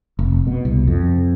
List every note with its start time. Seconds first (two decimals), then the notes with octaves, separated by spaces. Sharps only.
0.19 F1
0.47 B2
0.65 C2
0.88 F2